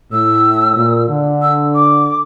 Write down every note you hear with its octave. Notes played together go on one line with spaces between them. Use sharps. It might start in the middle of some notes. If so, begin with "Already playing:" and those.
A2 E6
A#2
D3
E6
D6